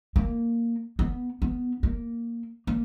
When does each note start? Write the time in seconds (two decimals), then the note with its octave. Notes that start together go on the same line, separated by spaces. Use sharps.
0.16 A#3
0.99 B3
1.42 B3
1.83 A#3
2.67 A#3